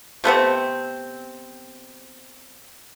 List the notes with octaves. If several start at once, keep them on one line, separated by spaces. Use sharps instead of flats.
C3 A3 B3 C4